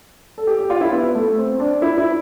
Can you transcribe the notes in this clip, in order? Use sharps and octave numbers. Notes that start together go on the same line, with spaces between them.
A4
G4
G4
F4
E4
B3
A3
C4
D4
E4
E4